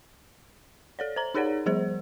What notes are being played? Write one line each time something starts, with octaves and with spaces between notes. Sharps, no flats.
A4 C#5 D5
C5 A#5
D#4 G#4 A#4 C#5 D5 F#5
F3 G3 G#4 C5